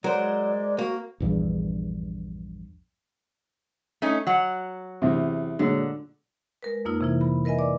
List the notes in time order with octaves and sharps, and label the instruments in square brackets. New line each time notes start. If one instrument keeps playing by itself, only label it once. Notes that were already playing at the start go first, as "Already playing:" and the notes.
[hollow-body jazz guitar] F#3 [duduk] G#3 [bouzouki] A#4 C5 [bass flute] D5
[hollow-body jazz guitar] A#3 [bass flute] F#4
[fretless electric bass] A#1 E2 G2
[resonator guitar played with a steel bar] A3 C#4 D#4
F#3 F#5
[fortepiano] E2 C3
[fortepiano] A#2 F#3 G#3 [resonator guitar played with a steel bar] D3
[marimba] G#3 A#4 B4
F2 A#3 D#4 F4 E6
C3 E3 E4
B5
A#4 B4 D#5 E5 G#5
D5 D6